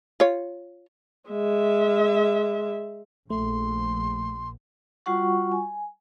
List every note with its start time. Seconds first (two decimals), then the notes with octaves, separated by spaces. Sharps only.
0.20 F4 C#5
1.30 G#3 E5
3.30 A#1 A3 C6
5.06 G3 F4 F#4 F#5 C#6
5.52 G#5